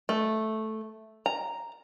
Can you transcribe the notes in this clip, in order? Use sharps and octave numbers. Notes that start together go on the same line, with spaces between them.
A3
A#5